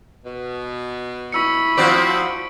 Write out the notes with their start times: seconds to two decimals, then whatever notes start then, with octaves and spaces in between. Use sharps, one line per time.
0.25 B2
1.33 E4 B5 C#6 E6 C#7
1.77 F3 F#3 C4 F#4 D5 D7